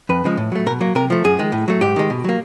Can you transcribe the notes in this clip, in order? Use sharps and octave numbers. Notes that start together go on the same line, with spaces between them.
F2 B4
C#3 F3 G#3
A2
F#3 A3
B2 A#4
F#3 A#3
C3 A#4
F3 A3
F#2 G#4
D#3 G#3
A2
F#3 A3
G#2 G4
D#3 G#3
B2
F#3 A#3